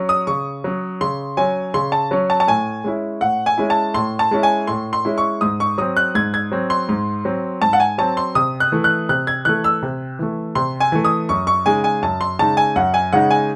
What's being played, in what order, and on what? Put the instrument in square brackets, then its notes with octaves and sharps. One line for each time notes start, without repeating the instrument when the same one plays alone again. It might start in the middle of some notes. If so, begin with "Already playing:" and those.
Already playing: [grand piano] F#3 C#4
[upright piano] D#6
[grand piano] C#3 [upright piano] C#6
[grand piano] F#3 C#4
[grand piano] C#3 [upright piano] C6
[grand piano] F#3 C#4 [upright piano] G#5
[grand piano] C#3 [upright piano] C6
[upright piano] A5
[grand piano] F#3 C#4
[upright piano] A5
A5
[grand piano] A2 [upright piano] G#5
[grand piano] G#3 C#4 E4
[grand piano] A2 [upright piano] F#5
[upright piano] G#5
[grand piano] G#3 C#4 E4
[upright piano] A5
[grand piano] A2 [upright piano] C6
[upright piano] A5
[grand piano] G#3 C#4 E4
[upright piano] G#5
[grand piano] A2 [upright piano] C6
[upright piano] C6
[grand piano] G#3 C#4 E4
[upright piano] C#6
[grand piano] G#2 [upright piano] D#6
[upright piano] C#6
[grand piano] F#3 C4 [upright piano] D#6
[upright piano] F#6
[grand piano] G#2 [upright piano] G#6
[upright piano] G#6
[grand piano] F#3 C4
[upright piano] C6
[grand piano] G#2
F#3 C4
[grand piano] G#2 [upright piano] A5
[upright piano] F#5
G#5
[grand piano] F#3 C4 [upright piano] A5
[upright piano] C6
[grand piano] C3 [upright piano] D#6
[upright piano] F#6
[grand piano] E3 A3
[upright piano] F#6
[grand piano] C3 [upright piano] F#6
[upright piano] G#6
[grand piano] E3 A3 [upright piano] F#6
[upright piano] E6
[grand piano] C3
E3 A3
[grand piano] C3 [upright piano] C6
[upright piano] G#5
[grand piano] E3 A3
[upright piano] D#6
[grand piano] F#2 [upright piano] C#6
[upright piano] C#6
[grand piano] C#3 G#3 D#4 [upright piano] G#5
[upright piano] G#5
[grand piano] F#2 [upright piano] A5
[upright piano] C6
[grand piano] C#3 G#3 D#4 [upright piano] A5
[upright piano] G#5
[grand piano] F#2 [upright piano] F#5
[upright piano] G#5
[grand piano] C#3 G#3 D#4 [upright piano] F#5
[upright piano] G#5